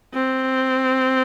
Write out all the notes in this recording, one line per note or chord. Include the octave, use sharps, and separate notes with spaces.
C4